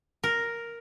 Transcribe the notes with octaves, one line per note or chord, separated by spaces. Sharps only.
A#4